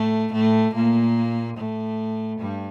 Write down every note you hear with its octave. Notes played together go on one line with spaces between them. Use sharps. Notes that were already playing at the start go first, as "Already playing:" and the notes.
Already playing: A2 A3
A2 A3
A#2 A#3
A2 A3
G2 G3